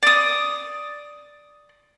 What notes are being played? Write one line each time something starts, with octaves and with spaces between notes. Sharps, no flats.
D5 D#6